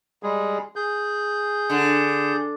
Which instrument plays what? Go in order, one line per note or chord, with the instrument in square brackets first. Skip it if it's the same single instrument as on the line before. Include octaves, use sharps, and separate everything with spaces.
[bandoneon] G3 G#3 G#4
G#4 G6
[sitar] D3